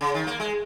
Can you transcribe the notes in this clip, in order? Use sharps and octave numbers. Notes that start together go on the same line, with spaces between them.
C#3
D#3
A#3
G#3